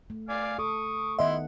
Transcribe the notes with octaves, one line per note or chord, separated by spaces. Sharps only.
A3
D5 F5 G#5
A4 C#6 D#6
D#3 B3 E4 D#5 E5 F#5 C6